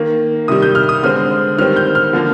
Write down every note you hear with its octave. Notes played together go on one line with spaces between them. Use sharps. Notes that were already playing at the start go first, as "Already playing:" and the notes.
Already playing: D#3 A#3
C3 D#3 G3 D#6
G6
F6
D#6
D3 G#3 C4 F6
D#3 G3 C4 F6
G6
F6
D3 F3 A#3